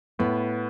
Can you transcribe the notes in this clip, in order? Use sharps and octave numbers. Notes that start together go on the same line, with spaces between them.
A2 B3